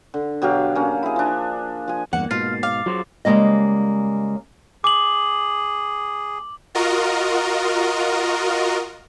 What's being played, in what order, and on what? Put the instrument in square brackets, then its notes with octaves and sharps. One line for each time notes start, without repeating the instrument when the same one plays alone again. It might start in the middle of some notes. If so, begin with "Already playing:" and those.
[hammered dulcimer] D3
B2 F#3 G4 F5
A#3 C#4
E4 G#4
F3 D4
F3 G#5
[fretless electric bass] E2 G2 [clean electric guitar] A#3 [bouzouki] F#5
[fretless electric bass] G#2 B2 [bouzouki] F4 [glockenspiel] A6 C7
[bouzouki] F5 [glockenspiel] D6
[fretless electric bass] F#3 [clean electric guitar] F4 G#4 C5
[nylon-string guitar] C#3 G3 G#3 A#3 D#5
[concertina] G#4 [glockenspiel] D6 F#7
[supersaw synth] F4 F#4 A#4 D#5